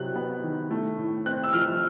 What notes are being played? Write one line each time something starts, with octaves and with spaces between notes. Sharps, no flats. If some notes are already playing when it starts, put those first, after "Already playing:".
Already playing: C3 F#3 F#6
B3
D#3
A3
A2
C4 F#6
E6
F3 F6